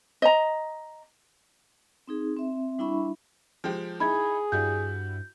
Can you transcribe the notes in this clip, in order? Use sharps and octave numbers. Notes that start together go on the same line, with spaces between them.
D#5 A#5
C4 D#4 G#4
C4 E5
G3 D4 E4 E5 B5 C#6
F3 G#3 G4
D#4 E4 G#4 B5 G#6
G2 G3 E4 F#4 G6